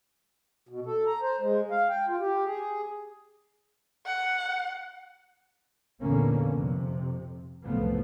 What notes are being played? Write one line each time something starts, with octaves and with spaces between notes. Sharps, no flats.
B2
A4
A#5
C5
G#3
F5
G5
F4
G4
G#4
F#5
E2 A#2 D3 A#3 B3 C#4
F2 C3
F#1 C2 A2 F3 A3 B3